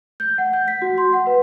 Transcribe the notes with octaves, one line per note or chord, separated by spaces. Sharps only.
G6
F#5
G6
B6
F#4
C6
F#5
B4